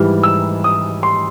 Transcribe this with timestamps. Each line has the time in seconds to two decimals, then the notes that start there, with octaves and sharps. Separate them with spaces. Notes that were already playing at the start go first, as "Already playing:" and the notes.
Already playing: G#2 E3 G3 F6
0.23 E6
0.64 D#6
1.03 C6